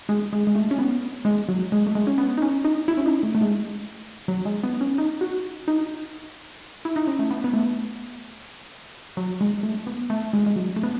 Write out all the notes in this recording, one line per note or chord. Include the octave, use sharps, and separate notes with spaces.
G#3
G#3
G#3
A3
C#4
B3
G#3
F#3
G#3
A3
G#3
C#4
B3
D#4
C#4
D#4
E4
C#4
D#4
A3
A3
G#3
F#3
G#3
B3
C#4
D#4
F#4
D#4
E4
D#4
C#4
A3
B3
B3
A3
F#3
G#3
A3
B3
A3
G#3
G#3
F#3
A3
B3